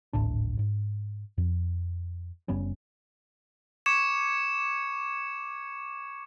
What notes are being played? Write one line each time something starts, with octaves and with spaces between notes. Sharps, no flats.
D1 G#1 A2 D4
G#2
F2
F#1 G3 B3 C#4
C#6 D6 G#6 C#7 E7